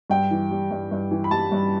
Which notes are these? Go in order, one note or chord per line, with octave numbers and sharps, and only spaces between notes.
G2 G5
E3
G3
G2
G2
E3
B5
G3 A5
G2